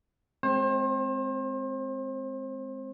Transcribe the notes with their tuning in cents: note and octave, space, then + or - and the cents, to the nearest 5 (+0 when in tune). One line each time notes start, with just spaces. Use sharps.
G#3 +20 C4 +0 C5 +35